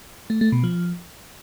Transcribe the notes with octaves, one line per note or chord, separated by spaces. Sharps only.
A3
A3
B2
F3